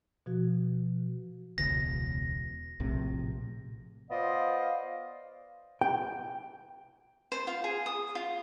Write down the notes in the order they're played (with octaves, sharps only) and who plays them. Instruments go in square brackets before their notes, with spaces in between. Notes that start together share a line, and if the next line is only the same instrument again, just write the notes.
[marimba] B2 F3 F#4
[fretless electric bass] E1 C#2 B2 [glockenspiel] A#6
[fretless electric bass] A#1 A2 C3
[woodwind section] B3 F4 C5 D5 D#5 F5
[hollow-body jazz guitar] G5
[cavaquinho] C5
F4
G#4
D#6
F4